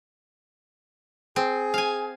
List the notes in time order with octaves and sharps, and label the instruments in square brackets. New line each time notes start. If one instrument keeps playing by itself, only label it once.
[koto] C4 [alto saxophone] G#4
[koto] F5 G#5